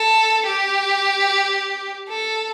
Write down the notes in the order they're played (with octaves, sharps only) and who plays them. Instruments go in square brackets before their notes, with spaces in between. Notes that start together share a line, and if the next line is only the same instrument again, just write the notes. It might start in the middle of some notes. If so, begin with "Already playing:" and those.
Already playing: [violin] A4
G4
A4